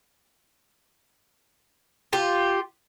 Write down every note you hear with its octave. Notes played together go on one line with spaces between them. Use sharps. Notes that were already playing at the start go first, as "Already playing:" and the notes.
F4 G4